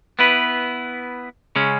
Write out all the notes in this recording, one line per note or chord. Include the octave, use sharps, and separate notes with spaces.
B3 E4 B4
C#3 G#3 C#4